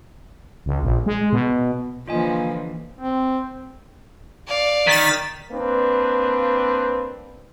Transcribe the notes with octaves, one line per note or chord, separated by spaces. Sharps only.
C#2
A#1
G#3
B2
D3 E3 F3 A#3 F4 D#5 G#5
C4
D5 F5
D#3 A6 B6
A#3 C4 D4 B4